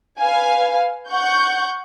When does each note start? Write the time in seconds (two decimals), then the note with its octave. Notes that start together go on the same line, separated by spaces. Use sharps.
0.19 B4 F5 G#5
1.09 F#5 C#6 G6